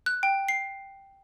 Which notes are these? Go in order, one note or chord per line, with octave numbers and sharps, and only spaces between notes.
F#6
G5
C7